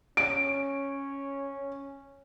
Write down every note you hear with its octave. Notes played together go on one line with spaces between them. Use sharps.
C#4 D7